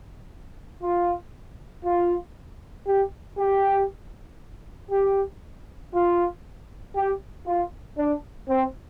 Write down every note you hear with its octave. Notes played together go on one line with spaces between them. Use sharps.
F4
F4
G4
G4
G4
F4
G4
F4
D4
C4